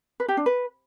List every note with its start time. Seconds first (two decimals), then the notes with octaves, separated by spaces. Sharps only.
0.20 B4
0.28 G4
0.37 D4
0.46 B4